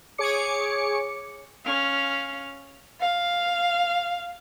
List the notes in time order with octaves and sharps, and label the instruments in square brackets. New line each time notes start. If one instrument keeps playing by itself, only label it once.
[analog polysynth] G#4 C#5 D6 C#7
[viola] C#4 F5
[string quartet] F5